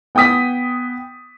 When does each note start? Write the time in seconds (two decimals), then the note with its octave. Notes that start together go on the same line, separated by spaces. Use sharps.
0.15 B3 G5 G#5 D#6 B6